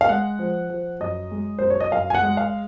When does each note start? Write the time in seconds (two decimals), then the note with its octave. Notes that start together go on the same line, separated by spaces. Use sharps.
0.01 F5
0.09 G#3 F#5
0.39 F3
0.70 F3
1.00 F#2 D#5
1.31 G#3
1.59 F#2 C5
1.70 C#5
1.80 D#5
1.92 F#2 F5
2.10 G#5
2.15 F#5
2.22 G#3
2.37 F5